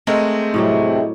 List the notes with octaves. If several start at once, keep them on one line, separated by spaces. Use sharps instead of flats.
G#3 A3 C4 A#4
A2 C3 F#3 G3